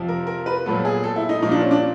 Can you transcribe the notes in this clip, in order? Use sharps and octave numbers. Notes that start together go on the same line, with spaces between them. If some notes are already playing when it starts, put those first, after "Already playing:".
Already playing: F2 C3 F3
A#4
A#4
B4
A#2 F#3 B3 A4
G#4
A4
E4
D#4
A#2 F3 A#3 D#4
D4
C#4
D4